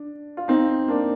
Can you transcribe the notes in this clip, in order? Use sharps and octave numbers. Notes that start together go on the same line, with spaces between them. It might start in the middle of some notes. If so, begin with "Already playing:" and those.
Already playing: D4
F4
C4 D#4
A#3 D4